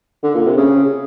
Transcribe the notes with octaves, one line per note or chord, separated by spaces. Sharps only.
D3
A#2
C3
C#3